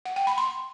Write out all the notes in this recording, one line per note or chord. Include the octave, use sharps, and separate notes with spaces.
F#5
G5
B5
C6